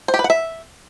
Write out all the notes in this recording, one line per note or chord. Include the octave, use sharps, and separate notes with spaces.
C5
G4
B4
F#5
E5